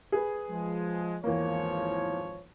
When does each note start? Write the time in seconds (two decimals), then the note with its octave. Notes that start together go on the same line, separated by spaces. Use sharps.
0.12 G#4 B4
0.49 F3 G#3
1.24 G#1 E2 F3 A#3 C#5